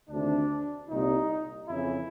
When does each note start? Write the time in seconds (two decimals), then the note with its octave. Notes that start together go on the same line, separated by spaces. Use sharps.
0.09 D2 C3 D#3 D4
0.89 C2 A#2 D#4
1.69 F2 C#3 E3 E4